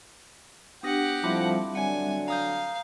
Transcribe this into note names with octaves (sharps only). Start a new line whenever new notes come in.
B3 D4 G4 F#5 D#6 A#6
A2 F3 G3 C4 D4 E4 E5 D6
D3 F#3 D4 F#5 G#5
F5 A#5 D#6 G6